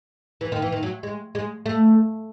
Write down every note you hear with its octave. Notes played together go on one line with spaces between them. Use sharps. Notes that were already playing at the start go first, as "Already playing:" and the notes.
E3
D#3
E3
D#3
F#3
G#3
G#3
A3